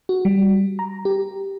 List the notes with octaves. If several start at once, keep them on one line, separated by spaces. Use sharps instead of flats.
F#4
G3
A#5
G4